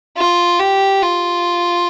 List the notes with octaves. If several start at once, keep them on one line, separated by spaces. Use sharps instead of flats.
F4
G4
F4